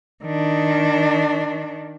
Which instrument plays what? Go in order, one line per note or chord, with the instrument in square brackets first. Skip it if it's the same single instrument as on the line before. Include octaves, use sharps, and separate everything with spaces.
[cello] D#3 D4